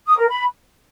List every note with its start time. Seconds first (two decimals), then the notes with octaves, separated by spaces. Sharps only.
0.07 D#6
0.17 A#4
0.28 B5